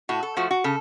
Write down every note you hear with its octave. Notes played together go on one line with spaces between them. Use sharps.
A2 F#4
A4
F3 A3 F#4
F#4
C#3 A4